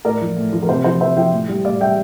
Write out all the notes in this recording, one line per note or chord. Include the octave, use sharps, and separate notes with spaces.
A2 A#4 D5
F3
A2
F3
A#4
C3 C5
F3 C5
C3 C5 E5
F3 E5 G5
A2
G3
A2 D5 F5
G3 E5 G5